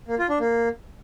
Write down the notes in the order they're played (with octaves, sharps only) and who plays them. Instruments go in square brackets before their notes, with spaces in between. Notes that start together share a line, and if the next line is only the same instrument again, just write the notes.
[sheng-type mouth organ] A#3
F4
D4
A#3